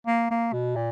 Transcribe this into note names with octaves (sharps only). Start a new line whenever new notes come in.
A#3
A#3
B2
A#2